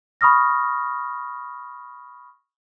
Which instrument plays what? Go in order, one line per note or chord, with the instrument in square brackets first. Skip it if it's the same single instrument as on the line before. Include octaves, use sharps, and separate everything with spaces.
[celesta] B5 C#6 D#6 F6 A#6